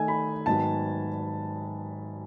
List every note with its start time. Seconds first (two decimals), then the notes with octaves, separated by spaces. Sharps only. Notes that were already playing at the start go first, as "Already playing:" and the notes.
Already playing: D#3 A3 D#4 A4 G#5
0.08 B5
0.46 G#2 D#3 F#3 B3 F#4 A5